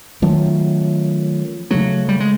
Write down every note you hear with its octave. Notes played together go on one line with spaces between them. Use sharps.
D#3 F3 F#3 A3 C#4
C#3 F3 F#3 A3
G3
G#3